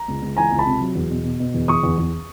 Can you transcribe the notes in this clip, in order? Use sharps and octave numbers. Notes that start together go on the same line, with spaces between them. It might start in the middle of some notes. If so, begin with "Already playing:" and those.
Already playing: A#5
C#2
C#2
E3 G#5 A#5
C#2
A5 B5
C3
F#3
E2
B2
B2
B2
E2
E2 C#6 D#6
E2
E2